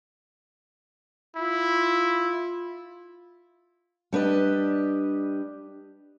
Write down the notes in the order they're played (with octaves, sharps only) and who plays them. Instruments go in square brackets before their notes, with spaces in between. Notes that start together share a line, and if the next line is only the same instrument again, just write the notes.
[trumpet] E4 [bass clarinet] F4
[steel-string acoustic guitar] G3 D4 B4 D#5